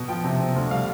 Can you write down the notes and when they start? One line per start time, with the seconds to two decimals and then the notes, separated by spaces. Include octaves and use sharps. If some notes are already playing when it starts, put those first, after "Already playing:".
Already playing: B2
0.08 F3 G5
0.24 C3
0.40 C4
0.56 D2
0.71 G3 F5